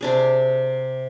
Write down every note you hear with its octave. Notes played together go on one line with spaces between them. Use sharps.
C3 D4 G#4